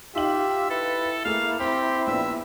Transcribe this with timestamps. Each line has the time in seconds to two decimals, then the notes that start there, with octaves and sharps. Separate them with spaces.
0.15 D#4 F4 G4 E5 F5 F#7
0.70 E4 A4 B4
1.25 A3 A#3 G#4 F5
1.60 C4 G4 B5
2.07 A#1 B3 D4 E5